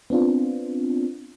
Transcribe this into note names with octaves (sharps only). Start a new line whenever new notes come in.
B3 C4 D4 F4